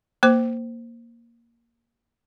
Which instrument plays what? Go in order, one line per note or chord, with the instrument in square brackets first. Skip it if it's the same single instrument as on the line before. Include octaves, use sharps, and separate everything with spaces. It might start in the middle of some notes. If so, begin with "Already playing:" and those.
[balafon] A#3 C5 D6